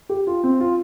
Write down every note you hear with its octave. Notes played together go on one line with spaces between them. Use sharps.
G4
F4
C4
F4